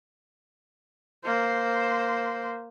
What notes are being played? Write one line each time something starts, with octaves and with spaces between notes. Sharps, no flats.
A#3 C5